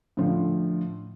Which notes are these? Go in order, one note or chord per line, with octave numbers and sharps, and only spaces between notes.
A2 D3 F3